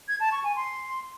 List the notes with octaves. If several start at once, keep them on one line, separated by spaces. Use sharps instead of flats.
G#6
A5
C#6
G#5
C6